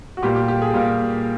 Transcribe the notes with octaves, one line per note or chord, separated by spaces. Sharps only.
F#4
A#2 G3 A#3 G4
G4
G4
G#4
A#2 G3 A#3